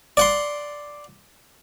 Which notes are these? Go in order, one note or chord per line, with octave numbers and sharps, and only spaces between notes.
D5 F#5 C6